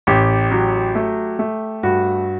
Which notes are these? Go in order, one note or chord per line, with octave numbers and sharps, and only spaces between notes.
A1 G4
F#3
A3
A3
G2 F#4